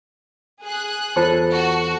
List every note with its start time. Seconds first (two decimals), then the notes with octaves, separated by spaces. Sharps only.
0.63 G#4 F#6
1.16 E2 F4 A4 C5 B5
1.54 F#4